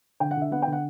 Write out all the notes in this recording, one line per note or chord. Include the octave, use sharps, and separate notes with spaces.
D3 G5
F#5
D3 E5
B3 F#5
G5
D3
F#5